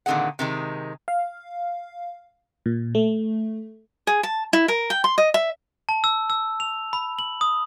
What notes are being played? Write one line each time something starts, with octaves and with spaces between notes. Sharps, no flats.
A#2 D3 D#3 C4 G#4 F#5
C3 D#3 G#3
F5
A#2
A3
G#4
A5
E4
A#4
G5
C6
D#5
E5
A5
E6
E6
F7
B5
F#7
D#6